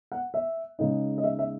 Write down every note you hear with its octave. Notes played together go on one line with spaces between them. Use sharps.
F#5
E5
C#3 G#3 D#4
D#5
E5
E5